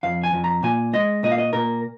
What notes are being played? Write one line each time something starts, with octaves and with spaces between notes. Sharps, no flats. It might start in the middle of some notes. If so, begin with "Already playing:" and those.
F2 F5
G#5
F2
A#5
A#2 G#5
G#3 D#5
A#2 D#5
F5
D#5
A#2 A#4